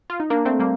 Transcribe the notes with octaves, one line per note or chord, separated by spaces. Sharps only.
F4
D#4
A#3 D4
A3 C4
G3 A#3